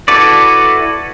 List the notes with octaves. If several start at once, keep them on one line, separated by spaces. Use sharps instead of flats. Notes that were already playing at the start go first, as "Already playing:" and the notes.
E4 F#4 A4 B4 D5